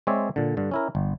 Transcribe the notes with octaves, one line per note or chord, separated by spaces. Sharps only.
G#3 C4 C#5 D5 E5
A#2 D3
G2 D3
C#4 E4 A#4
G1